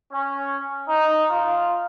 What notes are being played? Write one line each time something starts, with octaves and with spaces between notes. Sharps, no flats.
C#4
D#4
F4